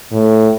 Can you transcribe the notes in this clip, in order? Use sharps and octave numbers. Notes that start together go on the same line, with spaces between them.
A2